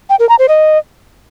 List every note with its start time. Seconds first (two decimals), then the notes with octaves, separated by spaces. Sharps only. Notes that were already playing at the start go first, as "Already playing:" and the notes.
0.10 G5
0.19 A#4
0.29 A#5
0.39 C5
0.49 D#5